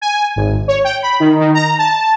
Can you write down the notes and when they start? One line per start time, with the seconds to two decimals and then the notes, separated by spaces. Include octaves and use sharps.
0.01 G#5
0.36 G#1
0.68 C#5
0.84 G5
1.02 B5
1.20 D#3
1.40 D#3
1.54 A#5
1.79 A5